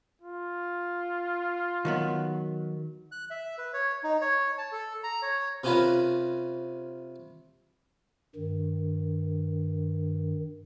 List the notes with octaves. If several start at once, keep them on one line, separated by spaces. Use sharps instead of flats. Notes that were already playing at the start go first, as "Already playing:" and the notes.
F4
D#3 F#3 B3
F#6
E5
B4
C#5
D#4
C#5
A5
A4
A#5
C#5
C3 C#4 D4 F4 A#4 B4
G2 D#3